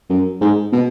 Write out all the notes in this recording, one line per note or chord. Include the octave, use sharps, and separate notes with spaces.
F#2
G#2
B2